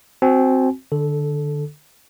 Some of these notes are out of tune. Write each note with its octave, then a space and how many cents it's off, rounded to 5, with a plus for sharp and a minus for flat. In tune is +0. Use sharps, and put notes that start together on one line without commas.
C4 +0 F#4 +0 G#5 +35
D3 +20 A4 -10